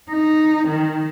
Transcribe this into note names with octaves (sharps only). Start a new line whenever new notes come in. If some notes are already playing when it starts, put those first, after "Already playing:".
D#4
D#3